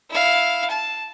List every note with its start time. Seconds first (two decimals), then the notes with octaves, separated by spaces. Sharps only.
0.10 E4 F5
0.70 A5